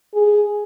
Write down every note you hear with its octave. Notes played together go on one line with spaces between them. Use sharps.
G#4